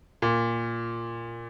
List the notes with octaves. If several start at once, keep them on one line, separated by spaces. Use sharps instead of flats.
A#2